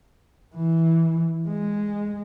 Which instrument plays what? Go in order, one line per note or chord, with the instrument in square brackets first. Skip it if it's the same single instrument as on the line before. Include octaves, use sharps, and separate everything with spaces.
[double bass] E3
G#3